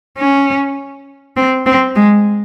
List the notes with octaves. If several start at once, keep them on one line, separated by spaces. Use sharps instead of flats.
C#4
C4
C4
G#3